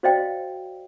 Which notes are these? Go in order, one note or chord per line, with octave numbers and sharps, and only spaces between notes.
F#4 C5 D5 D#5 F5 G5